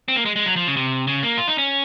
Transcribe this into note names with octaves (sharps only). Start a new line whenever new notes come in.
C4
A#3
G#3
G#3
F#3
F3
C#3
C3
C#3
A#3
F4
D#4
C#4